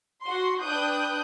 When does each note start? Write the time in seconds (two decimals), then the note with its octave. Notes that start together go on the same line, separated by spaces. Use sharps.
0.22 F#4 C6
0.61 D4 B4 G5 D#6 F#6 G6